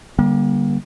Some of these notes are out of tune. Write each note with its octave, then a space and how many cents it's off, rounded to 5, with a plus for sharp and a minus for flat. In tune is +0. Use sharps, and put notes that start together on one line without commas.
D3 +0 G3 +0 A#3 +40